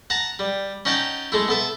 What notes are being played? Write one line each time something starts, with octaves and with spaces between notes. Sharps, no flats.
F#5 A5 A#5
G3
C#4 D#4 F#5 G5 A5
G#3 A3 E4
B3 A4 E5